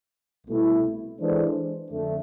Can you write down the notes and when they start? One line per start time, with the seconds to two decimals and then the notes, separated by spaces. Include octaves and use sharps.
0.47 C2 B2 A3 E4
1.18 E3 G#3 D4 A4 C5
1.91 F2 D3 A3